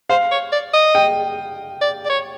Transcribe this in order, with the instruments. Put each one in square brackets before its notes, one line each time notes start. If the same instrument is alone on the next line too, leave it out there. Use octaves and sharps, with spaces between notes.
[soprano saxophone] C5 [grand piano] F5
[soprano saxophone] C#5
D5
D#5
[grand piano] G5
[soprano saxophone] D5
D5
C#5